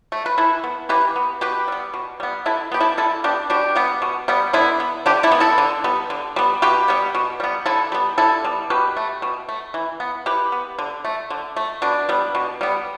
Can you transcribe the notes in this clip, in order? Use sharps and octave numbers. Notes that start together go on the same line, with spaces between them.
A3
B4
E3 E4 A4
B3
E3 G4 B4
B3
B2 G4 B4
G3 B3
B2
G3 B3
D3 E4 A4
B3 G4
E4 A4
D3 E4 A4
B3 D4 G4
B2 D4 G4
G3 B3
B2
G3 B3
D3 B3 E4
B3
D3 D4 G4
E4 A4
B3
E4 A4
D3
G3 B3
D3
G3 B3
B2 G4 B4
G3 B3
B2
G3 B3
D3 E4 A4
G3 B3
D3 E4 A4
G3 B3
B2 G4 B4
A3
B2
A3
E3
B3
E3 G4 B4
B3
D3
A3
D3
A3
B2 D4
G3 B3
B2
G3 B3